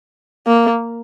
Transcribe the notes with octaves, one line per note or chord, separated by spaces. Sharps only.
A#3